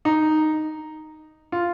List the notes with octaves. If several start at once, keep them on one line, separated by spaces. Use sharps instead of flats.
D#4
F4